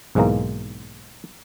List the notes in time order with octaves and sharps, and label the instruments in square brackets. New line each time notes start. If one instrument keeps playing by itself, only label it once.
[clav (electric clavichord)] B1 G#2 E3 G#3 A#3 A#5